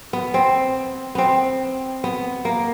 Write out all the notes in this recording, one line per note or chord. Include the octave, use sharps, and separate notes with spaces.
B3
C4
B3 C4
B3
A#3